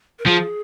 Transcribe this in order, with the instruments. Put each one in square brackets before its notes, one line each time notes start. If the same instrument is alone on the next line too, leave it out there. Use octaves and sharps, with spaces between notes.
[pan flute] A#4
[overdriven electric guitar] F3 [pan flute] G#4